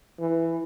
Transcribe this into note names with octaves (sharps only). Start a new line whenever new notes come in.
E3